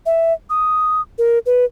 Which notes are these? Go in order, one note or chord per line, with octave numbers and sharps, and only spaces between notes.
E5
D#6
A#4
B4